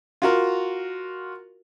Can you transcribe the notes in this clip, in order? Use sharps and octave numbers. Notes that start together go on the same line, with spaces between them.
F4 F#4 A#4